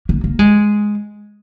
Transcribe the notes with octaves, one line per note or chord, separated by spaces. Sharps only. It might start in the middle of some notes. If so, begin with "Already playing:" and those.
A#3
A#3
G#3